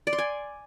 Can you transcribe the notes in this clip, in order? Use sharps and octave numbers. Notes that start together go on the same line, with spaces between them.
D5
C6
G#5